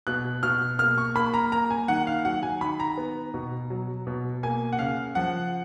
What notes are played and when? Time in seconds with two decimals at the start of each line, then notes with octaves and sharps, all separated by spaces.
0.07 B2 F#6
0.43 B2 F6
0.79 A#3 F6
0.98 C#6
1.15 A#3 B5
1.34 A#5
1.52 A#3 A#5
1.70 G#5
1.88 D#3 F#5
2.07 F5
2.25 F#3 F#5
2.43 G#5
2.61 D#3 B5
2.80 A#5
2.97 B3
3.34 B2
3.70 F#3
4.07 B2
4.43 A#3 G#5
4.72 F#5
4.79 C#3 F5
5.15 F3 F#5